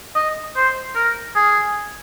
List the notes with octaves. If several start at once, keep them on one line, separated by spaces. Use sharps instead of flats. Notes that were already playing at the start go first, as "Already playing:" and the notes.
D#5
C5
A#4
G#4